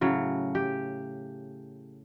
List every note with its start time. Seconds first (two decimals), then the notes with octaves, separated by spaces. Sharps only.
0.01 A2 C#3 F#3
0.55 G4